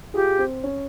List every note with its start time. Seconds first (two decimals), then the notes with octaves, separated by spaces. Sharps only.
0.14 F4 G4 G#4
0.38 C4
0.63 C#4